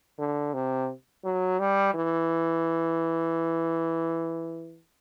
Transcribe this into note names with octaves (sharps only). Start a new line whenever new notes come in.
D3
C3
F#3
G3
E3